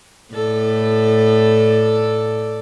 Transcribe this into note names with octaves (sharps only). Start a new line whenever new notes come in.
A2 A4 D5